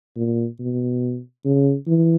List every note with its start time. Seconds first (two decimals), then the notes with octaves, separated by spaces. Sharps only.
0.16 A#2
0.60 B2
1.45 C#3
1.87 E3